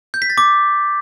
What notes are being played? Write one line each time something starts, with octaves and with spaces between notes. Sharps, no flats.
G6
B6
A6
D6